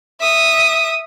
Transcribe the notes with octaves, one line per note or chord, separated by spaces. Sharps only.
E5 D#6